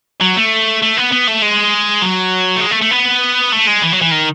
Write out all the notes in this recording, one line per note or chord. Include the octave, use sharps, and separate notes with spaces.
F#3
A3
A3
B3
B3
A3
G#3
F#3
A3
G#3
A3
A3
B3
A3
G#3
E3
F#3
E3
D#3